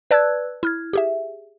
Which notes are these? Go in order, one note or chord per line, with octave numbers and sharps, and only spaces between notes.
B4 D5 A5 E6 F#6 G#6
E4 F6 G#6
G4 G#4 E5